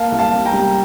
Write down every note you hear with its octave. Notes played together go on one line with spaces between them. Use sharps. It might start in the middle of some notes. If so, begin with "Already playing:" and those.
Already playing: A#3 F5 A5
C2
F5 A5
C3
G5 A#5
G3